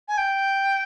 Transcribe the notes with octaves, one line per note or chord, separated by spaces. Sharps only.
G#5
G5